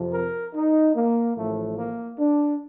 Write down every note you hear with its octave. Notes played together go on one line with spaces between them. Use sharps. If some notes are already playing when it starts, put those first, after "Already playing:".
Already playing: F2 C3 F3
A#4
D#4
A#3
A1 A2 F3 A3
A#3
D4